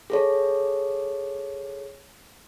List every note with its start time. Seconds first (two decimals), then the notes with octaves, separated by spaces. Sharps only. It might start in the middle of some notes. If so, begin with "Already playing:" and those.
0.10 G#4 A4 C#5